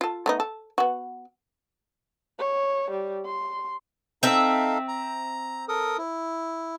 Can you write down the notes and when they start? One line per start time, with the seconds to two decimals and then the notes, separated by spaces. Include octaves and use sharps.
0.01 F4 A4
0.26 A3 B3 D#4
0.40 A4
0.78 B3 F#4
2.39 C#5
2.91 G3
3.25 C6
4.23 C4 D#4 A4 E5 F5
4.88 A#5
5.68 A4 A#4 D#6
5.98 E4